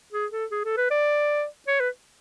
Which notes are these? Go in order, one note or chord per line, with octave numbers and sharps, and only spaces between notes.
G#4
A4
G#4
A4
B4
D5
C#5
B4